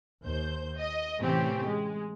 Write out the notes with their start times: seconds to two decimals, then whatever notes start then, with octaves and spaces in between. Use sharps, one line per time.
0.25 D#2 C5 G6
0.78 D#5
1.20 A2 C3 E3 C4 C#4 G4
1.66 G#3